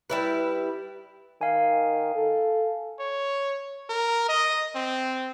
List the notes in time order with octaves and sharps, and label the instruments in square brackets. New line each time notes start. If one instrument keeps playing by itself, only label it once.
[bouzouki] G3 E4 B4
[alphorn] D#3 [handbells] F5 G#5
[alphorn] A4
[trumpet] C#5
A#4
D#5
C4